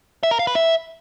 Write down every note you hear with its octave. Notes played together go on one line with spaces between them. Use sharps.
E5
A#4
F5
B4
E5